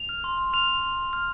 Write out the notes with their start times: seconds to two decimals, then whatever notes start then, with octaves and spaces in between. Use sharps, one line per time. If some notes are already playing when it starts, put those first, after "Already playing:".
Already playing: F7
0.09 F6
0.24 C6
0.38 C6
0.53 F6 F7
0.68 F6
0.82 C6
0.97 C6
1.13 F6